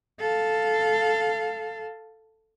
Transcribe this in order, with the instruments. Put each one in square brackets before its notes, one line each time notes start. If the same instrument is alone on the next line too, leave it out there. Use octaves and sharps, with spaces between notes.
[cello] A4 F5